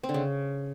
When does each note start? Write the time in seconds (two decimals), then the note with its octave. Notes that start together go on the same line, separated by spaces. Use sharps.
0.03 C4
0.09 D3
0.14 C#3